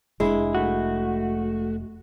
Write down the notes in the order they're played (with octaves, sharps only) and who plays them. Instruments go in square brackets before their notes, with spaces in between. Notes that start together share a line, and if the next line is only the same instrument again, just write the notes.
[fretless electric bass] F1 A2 D4 [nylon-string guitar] G#3 E4
[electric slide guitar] A3 F#4